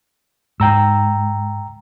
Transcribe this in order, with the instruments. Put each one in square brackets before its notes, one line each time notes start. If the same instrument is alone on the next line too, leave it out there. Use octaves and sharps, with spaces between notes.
[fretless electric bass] G#2 [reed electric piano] G5 A#5 E6